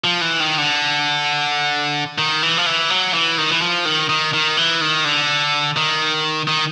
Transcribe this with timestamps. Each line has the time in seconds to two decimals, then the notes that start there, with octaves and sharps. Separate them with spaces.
0.04 F3
0.21 E3
0.40 D#3
0.58 D3
2.18 D#3
2.43 E3
2.57 F3
2.66 E3
2.90 F#3
3.14 E3
3.38 D#3
3.52 E3
3.62 F3
3.85 D#3
4.09 D#3
4.33 D#3
4.57 E3
4.81 D#3
5.05 D3
5.76 D#3
6.48 D#3